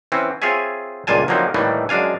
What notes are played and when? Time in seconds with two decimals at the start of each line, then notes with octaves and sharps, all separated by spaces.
0.12 E3 C4 C#4
0.42 C4 F4 G#4 C#5 E5 G#5
1.07 C#2 G2 A#2 F4 G#5 A5
1.28 D3 F3 F#3 A#3 C4 D#4
1.54 A2 D#3 E3 G3 A3 A#3
1.89 F#2 G#3 D4 F5 G#5